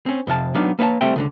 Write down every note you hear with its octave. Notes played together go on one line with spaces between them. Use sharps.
C4 C#4
F2 C3 F5 A5
F#3 B3 D4 D#4 F5
A#3 B4 C#5 E5 A5
C2 G3 A3 C4 E5 G5
C#2 A2 D3